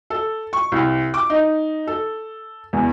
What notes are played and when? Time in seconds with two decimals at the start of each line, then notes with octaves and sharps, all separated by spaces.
0.10 A4
0.53 C#6
0.72 C2
1.14 D6
1.30 D#4
1.87 A4
2.73 E2